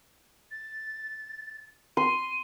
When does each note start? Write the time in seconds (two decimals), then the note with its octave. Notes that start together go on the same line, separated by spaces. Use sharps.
0.51 A6
1.97 C6 D#7